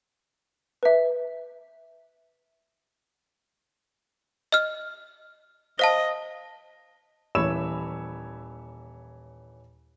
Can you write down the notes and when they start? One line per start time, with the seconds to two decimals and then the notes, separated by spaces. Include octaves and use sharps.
0.83 B4 E5
4.52 D#5 F6
5.79 C5 D#5 F5 A5
7.35 D#1 E3 C#5 B5 E6 E7